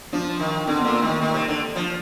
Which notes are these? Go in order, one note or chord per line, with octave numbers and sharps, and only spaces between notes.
F3 D4
D#3
D3 C4
A#2 A#3
A#3
D#3 A3
A#3
D#3
C3
D3
F3